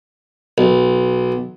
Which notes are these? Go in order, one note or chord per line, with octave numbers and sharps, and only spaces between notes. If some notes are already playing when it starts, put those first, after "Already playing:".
B1